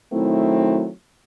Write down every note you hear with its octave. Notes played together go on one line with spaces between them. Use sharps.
D#3 F#3 A3 C4 E4